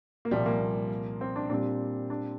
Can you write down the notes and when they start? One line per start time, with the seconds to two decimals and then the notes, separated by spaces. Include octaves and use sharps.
0.25 A#3
0.31 C2 A#2 F3 G3
0.46 A#3
1.21 C4
1.36 D4
1.49 A#2 G3 C4 D4
2.10 D4